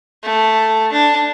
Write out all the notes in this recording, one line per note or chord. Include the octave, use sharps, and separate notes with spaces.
A3
D4